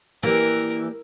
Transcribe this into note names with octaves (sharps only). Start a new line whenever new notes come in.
E3 A#3 G4 A#4 D5